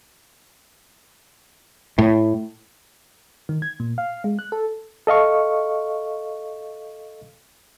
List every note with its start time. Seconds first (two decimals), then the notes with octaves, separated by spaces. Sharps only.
1.98 A2
3.49 D#3
3.62 G#6
3.80 A#2
3.98 F5
4.24 G#3
4.39 F#6
4.52 A4
5.07 A4 D#5 F5 C#6